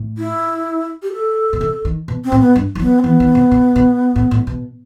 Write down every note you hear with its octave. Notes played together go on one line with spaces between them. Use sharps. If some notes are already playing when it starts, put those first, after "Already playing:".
Already playing: A2
E4
G4
A4
B2
C3
D#3
B2
C4
A2
B3
G2
E3
F#3 B3
C4
E3 B3
D#3
C3
B2
B2
A2
A2
B2